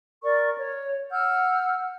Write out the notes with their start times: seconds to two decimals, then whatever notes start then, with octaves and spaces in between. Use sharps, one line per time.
0.24 A#4 D5 C#6
0.59 C#5
1.11 F#5 E6 F6 G6